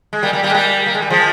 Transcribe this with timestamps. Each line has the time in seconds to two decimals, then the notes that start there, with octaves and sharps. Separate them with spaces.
0.13 G#3
0.23 G3 A#3
0.33 G3 A#3
0.43 G3 A#3
0.50 G#3
0.54 G3 A#3
0.86 A#3
0.95 G#3
1.02 G3
1.10 F3 G#3